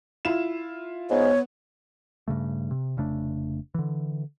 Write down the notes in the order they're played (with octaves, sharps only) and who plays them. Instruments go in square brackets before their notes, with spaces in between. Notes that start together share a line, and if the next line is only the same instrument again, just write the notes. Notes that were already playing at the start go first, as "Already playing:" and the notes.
[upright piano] E4 F4 E7
[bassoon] G#2 [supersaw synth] B3 [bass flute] C#5
[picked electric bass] G2 C#3 A3
C3
F1 C#3 A3 D4
D3 E3